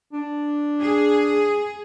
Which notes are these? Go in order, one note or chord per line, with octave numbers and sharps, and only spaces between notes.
D4
G#4